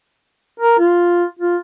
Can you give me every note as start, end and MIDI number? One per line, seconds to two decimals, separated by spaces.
0.60 0.78 70
0.79 1.25 65
1.39 1.57 65